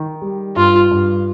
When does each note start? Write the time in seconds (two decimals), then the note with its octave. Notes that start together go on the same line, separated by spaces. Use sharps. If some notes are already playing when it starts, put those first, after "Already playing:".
Already playing: D#3
0.22 G3
0.56 G2 F4
0.91 G2